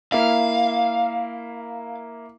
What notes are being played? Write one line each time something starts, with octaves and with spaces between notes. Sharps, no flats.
A#3 E4 F5